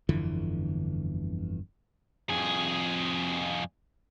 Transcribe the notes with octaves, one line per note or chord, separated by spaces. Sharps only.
G1 F2 D3 E3
F2 G#4